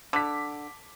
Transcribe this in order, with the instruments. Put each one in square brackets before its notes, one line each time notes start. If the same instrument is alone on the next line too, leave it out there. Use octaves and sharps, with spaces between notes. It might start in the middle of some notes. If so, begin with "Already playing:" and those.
[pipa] D3 [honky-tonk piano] D6 B6